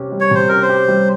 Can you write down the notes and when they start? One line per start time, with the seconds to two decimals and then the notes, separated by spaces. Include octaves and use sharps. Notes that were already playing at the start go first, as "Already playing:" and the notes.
Already playing: C3 C#4 G4
0.12 G3
0.21 C#5
0.31 C3 C5
0.49 C#4 A#4
0.62 C5
0.69 G4
0.88 G3